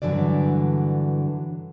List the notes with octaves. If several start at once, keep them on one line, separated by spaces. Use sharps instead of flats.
G2 D3 E3 F#3 D5